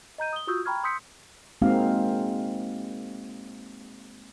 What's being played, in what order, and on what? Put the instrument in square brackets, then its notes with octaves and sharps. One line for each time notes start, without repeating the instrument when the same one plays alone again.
[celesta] D#5 A#5 G6 D#7
D#6 G7
F4 F#4 C#6 D#6 E6 G6
G5 A#5 B5 C#6 F6 G#6
C6 D#6 E6 G6 B6 C#7
[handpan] G#3 A#3 C4 D#4 F#4 F5